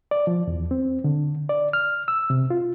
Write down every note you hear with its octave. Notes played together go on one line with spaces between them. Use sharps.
D5
F3
E2
C4
D3
D5
F6
E6
C3
F4